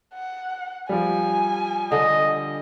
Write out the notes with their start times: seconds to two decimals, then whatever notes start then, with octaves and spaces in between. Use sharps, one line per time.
0.14 F#5
0.89 F3 G3 G#5
1.92 D3 D#5